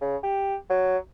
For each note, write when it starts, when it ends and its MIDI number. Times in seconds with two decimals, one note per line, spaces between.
0.01 0.16 49
0.23 0.55 67
0.70 0.97 54